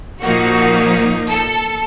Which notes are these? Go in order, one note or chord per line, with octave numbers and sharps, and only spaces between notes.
A#2 F3 A#3 D#4 F#4
A4